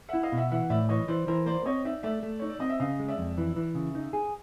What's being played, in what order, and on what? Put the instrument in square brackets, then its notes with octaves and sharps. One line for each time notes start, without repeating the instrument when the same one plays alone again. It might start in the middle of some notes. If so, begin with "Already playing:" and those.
[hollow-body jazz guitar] E4 [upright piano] E5 F#5
[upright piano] D#5 F5
[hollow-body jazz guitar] B2
[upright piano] E5 F#5
[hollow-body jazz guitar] E3 [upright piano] E5 F#5
[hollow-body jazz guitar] A2 [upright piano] D5 E5
[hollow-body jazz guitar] E3 [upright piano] C#5 D#5
[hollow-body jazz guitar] E3 [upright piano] C5 D5
[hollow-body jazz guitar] E3 [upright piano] A#4 C5
[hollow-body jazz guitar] A#3 [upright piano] C5 D5
[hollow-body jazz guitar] C4 [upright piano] C#5 D#5
[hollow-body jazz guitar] D#4 [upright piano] D5 E5
[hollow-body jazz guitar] A3 [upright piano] D5 E5
[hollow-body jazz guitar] A3
[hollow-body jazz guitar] D#4 [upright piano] C#5
[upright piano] D5
[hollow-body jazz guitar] C4 [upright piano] D#5
[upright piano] E5
[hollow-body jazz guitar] C#3 [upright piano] D#5 F5
[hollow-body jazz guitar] G#3
[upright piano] D5 E5
[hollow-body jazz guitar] F2
E3
E3
C#3
D#4
G#4